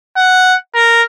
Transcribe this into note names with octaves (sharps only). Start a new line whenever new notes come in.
F#5
A#4